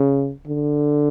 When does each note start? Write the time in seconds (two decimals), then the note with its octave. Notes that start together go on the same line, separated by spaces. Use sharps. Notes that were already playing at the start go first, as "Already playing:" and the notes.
Already playing: C#3
0.47 D3